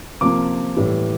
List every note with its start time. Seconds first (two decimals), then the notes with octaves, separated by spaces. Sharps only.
0.21 C3 F3 A#3 D6
0.76 A2 E3 G3